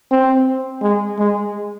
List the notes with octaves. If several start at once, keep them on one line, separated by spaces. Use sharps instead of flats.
C4
G#3
G#3